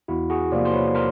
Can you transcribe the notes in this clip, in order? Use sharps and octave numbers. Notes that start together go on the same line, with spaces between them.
E2 E4 F#4
F#4 G#4
C3 F3 A#3 C5 D5
C5
B4 C#5
A#4 C5